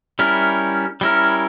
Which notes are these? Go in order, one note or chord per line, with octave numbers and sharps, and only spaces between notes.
G3 C#4 E4 A#4
G3 C#4 E4 A#4